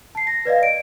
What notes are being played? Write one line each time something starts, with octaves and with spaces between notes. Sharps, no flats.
A5 C7
A#6
B4 D5 D#5 F5
D7